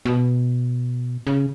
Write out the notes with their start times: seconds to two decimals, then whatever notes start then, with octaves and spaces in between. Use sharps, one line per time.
0.05 B2
1.27 C#3